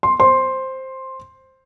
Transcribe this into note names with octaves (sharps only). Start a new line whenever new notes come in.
C6
C5 C6